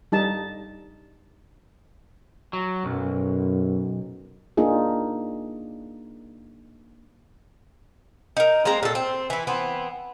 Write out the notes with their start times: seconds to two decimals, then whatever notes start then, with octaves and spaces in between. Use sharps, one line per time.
0.12 G3 D#4 A5
2.53 F#3
2.85 B1 F#2
4.57 A#3 D4 D#4 F4 G#4
8.37 D#4 A#4
8.65 G#3 A#3 C4 A#5
8.83 A#2 A4
8.95 C4
9.30 E3 E4
9.47 E3 B3 C4